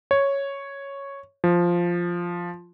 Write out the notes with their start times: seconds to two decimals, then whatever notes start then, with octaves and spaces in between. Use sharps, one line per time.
0.11 C#5
1.44 F3